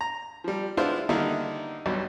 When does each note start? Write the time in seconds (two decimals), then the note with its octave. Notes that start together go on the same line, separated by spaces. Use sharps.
0.01 A#5
0.44 F3 G3
0.77 G#3 B3 D4 E4 F4 C5
1.09 D3 D#3 G3 A#3 D#4 E4
1.86 B1 G2 B2